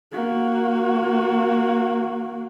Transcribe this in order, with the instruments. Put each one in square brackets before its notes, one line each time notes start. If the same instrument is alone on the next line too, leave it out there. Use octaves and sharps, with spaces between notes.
[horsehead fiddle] A#3 F#4